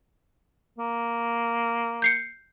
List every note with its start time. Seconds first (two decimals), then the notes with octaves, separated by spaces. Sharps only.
0.78 A#3
2.02 G6 C7 C#7